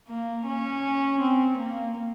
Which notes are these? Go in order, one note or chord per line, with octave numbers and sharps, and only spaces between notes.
A#3
C#4
C4
A#3